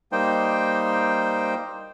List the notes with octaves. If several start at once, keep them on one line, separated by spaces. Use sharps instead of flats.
G3 A#3 D#4 C5 G5